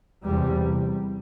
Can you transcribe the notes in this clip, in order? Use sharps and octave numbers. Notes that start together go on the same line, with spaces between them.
E2 C3 G3